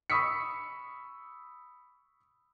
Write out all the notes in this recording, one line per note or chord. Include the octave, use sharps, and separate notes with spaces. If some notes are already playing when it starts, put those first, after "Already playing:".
B5 C#6 D#6 E6 B6 C#7